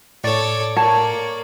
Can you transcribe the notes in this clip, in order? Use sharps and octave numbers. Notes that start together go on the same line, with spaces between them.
A2 A4 C#5 D5
A#3 C#5 D5 A5